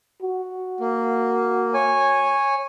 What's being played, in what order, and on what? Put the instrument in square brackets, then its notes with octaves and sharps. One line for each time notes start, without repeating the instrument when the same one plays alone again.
[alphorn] F#4
[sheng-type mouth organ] A#3
C#5 G#5